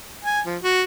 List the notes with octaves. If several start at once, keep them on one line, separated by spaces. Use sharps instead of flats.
G#5
F3
F#4